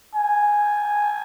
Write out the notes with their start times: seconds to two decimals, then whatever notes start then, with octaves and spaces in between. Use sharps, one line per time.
0.15 G#5